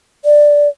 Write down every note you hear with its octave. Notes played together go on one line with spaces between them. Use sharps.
D5